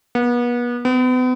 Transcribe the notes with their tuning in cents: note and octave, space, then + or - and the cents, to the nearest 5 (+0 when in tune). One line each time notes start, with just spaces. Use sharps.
B3 -35
B3 +40